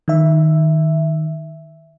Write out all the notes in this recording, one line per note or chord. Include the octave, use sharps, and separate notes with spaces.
D#3 E5